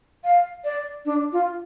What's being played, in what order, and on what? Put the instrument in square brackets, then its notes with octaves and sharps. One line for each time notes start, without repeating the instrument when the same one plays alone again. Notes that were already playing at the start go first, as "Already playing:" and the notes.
[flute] F5
D5
D4
F4